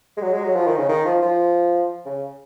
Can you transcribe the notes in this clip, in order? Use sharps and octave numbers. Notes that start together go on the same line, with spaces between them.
G#3
F#3
G#3
F#3
F3
D#3
C#3
D#3
F3
F3
C#3